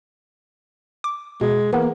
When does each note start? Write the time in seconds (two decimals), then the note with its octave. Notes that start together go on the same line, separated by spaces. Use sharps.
1.04 D6
1.41 B2 G#3
1.73 E3 A#3 B3